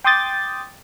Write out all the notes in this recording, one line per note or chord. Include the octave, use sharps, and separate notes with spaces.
G5 C6 D6 D#6 G6 A6